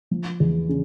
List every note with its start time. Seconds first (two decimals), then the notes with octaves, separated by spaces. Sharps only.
0.11 F3
0.40 E2
0.69 C#3